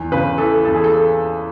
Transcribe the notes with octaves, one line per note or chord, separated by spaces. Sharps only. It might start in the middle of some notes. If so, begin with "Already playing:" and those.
Already playing: E2
C#3 B4
E3 A4
E2 A4
G#4
A4